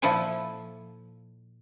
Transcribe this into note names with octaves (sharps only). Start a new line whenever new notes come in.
A#2 F3 E4 F4 A4 G#5